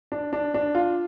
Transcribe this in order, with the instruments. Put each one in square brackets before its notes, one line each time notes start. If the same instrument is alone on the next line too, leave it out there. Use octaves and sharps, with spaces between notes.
[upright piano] D4
D4
D4
F4